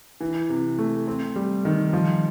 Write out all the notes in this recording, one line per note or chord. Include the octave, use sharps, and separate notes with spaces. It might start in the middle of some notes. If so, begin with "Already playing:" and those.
E3
C3
A3
C4
G3
D#3
F3